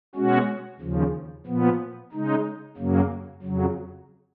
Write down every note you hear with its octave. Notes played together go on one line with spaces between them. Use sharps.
B2 G#3 C#4 F#4
D#2 C#3 F3
A#2 F3 B3
C#3 G#3 D#4
F#2 C#3 F#3 A#3
F2 C#3 F#3